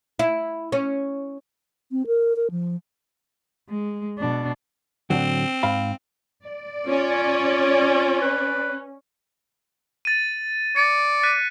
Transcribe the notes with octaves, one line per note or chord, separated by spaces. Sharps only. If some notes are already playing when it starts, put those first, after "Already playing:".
E4
C#4
C4
A#4
A#4
F3
G#3
B2 D4
A2 D3 F#3 C4
G#2 F5 B5
D5
C#4 F4
B4
A6 D#7
D5 C#7
F#6 B6 D#7